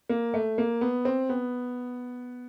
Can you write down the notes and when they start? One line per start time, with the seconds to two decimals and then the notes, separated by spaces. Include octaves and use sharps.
0.09 A#3
0.34 A3
0.58 A#3
0.81 B3
1.05 C4
1.29 B3